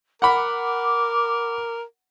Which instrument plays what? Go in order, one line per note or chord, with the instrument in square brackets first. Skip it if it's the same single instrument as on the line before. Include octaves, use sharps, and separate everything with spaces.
[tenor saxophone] A#4 [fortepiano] F#5 B5 [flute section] D6